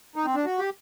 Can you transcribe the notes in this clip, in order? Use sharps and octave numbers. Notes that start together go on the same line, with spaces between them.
D#4
C4
D4
F#4
G4